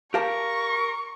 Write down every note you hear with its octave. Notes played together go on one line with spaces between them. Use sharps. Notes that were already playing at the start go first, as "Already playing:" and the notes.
G4 A#4 F5 A5 C#6